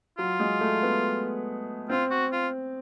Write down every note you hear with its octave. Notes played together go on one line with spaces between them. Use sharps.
F#3 F4
G#3
A3
B3
C4 F4
F#4
F4